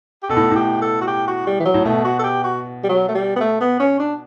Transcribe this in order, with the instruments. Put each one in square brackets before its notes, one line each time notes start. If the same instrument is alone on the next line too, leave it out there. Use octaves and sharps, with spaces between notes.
[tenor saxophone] G4
[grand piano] B2 [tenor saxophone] A4
[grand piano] A2
[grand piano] A2 [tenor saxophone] G4
[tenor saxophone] A4
F#4
G4
F#4
G3
E3
F#3
[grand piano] A2
[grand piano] B2 [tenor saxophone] A3
[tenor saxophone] F#4
A4
G4
F#4
G3
F#3
A3
G3
B3
A3
B3
C#4
D4